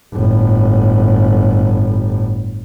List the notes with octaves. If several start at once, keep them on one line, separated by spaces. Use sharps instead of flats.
G1 A2